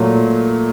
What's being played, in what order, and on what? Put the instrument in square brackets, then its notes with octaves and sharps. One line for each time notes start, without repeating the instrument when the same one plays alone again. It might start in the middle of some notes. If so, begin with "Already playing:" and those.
Already playing: [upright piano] A#2 F#3 A3